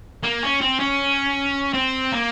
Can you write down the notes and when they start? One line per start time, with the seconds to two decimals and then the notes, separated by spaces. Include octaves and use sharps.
0.23 A#3
0.43 C#4
0.61 C4
0.80 C#4
1.73 C4
2.12 A#3